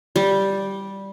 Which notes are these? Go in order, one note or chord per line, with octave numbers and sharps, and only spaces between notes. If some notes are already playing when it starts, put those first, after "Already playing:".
G3